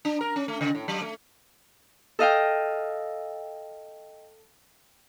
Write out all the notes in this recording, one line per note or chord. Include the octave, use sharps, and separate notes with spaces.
D4
A#4
C#4
A3
C#3
A2
F#3
A3
A4 D#5 F5 G5